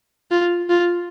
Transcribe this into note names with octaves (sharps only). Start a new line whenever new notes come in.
F4
F4